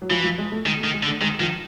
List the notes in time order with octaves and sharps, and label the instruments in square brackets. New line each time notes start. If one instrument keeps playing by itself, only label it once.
[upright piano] F#3
[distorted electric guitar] E3 [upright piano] F3
[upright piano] F3
G#3
A3
[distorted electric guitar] D#3 [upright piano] G#3
[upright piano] A3
[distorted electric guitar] D#3
[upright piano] G#3
[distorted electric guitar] D3
[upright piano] A3
[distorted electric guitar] D#3 [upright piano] G#3
[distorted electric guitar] D#3 [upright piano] F3